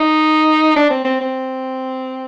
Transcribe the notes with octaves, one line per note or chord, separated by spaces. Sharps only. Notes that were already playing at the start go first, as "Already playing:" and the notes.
Already playing: D#4
D4
C4
C4
C4